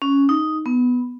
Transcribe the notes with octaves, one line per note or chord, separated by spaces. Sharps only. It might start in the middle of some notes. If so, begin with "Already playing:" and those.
C#4
D#4
B3